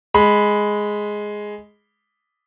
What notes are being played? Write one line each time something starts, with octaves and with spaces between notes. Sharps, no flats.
G#3 B5